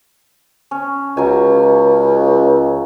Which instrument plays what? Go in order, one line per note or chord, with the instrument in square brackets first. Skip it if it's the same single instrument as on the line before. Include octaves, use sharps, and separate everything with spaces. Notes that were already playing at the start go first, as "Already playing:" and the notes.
[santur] C#4
[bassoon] C#2 [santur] F#3 G#5